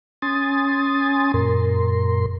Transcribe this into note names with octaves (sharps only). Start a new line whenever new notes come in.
C#4 G#5 C6 D#6 A6
F#2 A#2 A#4 C6